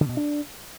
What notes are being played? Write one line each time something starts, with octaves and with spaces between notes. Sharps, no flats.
D3
B2
D4